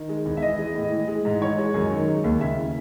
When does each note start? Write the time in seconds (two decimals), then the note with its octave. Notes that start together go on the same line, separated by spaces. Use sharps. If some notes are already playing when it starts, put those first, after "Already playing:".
Already playing: D#3
0.09 G#3
0.25 E2
0.37 E5
0.42 E3 D#5
0.59 G#3
0.75 A2
0.92 E3
1.08 G#3
1.25 G#2
1.41 E3 C#5
1.58 G#3
1.74 F#2
1.91 D#3
2.07 G#3
2.24 D#2
2.40 C#3 E5
2.57 E3